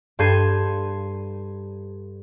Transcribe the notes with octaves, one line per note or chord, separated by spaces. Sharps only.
G2 A4 C6 G6 G#6 D#7